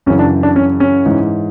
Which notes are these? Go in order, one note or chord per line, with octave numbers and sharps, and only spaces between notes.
F#2 C#3 E3 C#4
D4
D4
C#4
C#4
G#2 E3